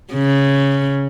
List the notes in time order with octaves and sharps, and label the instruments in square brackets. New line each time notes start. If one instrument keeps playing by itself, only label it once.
[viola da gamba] C#3